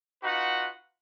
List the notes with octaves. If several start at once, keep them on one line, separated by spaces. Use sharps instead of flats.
D#4 F4 F#4 B4 F#5